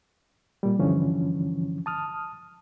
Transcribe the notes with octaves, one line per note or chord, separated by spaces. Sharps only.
A#2 G3
G2 D3 E3 F3 C#4
A5 D#6 F6